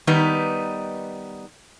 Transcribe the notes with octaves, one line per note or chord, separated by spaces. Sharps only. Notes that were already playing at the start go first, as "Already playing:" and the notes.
D#3 G3 B3 D#4 B4